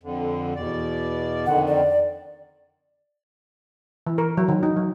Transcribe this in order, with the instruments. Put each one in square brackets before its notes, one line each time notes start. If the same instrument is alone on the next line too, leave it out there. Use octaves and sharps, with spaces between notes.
[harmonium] F2 D3
E2 B2 D5
[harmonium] F2 D3 D#3 [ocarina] F#5
[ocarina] D5
[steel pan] E3
A#4
F#3
D#3
D#4
F#3